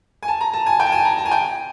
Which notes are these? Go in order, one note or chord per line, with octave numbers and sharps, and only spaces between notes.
G#5
A5
A#5
A5
G#5
G5
A5
G#5
A#5
A5
G#5
G5